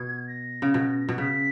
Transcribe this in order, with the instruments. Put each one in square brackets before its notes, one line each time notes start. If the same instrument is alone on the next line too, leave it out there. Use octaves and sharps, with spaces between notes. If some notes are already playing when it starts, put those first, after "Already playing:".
Already playing: [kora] B2 [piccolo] G#6
[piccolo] A#6
[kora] C#3
B2
B2
[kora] C#3 [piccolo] B6